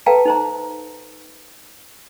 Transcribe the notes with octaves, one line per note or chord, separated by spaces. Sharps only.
A4 B4 F5 G5 A5 A#5
D#4 C5 A#5